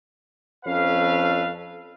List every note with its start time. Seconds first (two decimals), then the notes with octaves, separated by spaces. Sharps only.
0.65 F2 C#4 A4 B4 F5